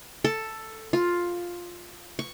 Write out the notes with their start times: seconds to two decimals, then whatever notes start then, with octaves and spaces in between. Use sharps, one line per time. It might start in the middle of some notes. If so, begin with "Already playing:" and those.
0.24 A4
0.93 F4
2.19 C#6